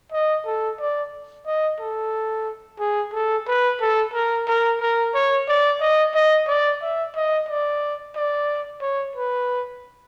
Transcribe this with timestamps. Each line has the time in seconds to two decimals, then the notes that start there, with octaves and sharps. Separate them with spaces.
0.12 D#5
0.46 A4
0.80 D5
1.46 D#5
1.79 A4
2.80 G#4
3.13 A4
3.48 B4
3.81 A4
4.14 A#4
4.47 A#4
4.81 A#4
5.14 C#5
5.48 D5
5.81 D#5
6.14 D#5
6.48 D5
6.82 E5
7.15 D#5
7.48 D5
8.16 D5
8.82 C#5
9.16 B4